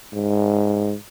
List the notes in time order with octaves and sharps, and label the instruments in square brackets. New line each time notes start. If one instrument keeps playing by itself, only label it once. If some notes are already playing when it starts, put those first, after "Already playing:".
[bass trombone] G#2